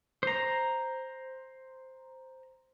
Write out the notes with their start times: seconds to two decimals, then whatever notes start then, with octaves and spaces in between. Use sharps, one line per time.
0.23 C5 A#5